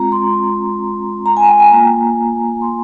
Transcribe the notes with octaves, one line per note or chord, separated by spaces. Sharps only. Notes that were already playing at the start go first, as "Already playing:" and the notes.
Already playing: G#3 C4 F4 A#5
C6
A#5
G#5
G5
G#5
A#3 F4 A#5
C6